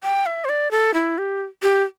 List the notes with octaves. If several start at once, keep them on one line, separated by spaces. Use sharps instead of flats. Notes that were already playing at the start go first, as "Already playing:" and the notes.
G5
E5
C5
D5
A4
E4
G4
G4